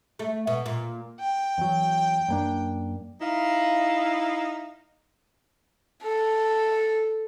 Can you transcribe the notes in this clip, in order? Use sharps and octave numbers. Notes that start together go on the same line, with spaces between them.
A3
B2
A#2
G5
E2 F#3
F#2 A#3 D4
D#4 E4 F5
A4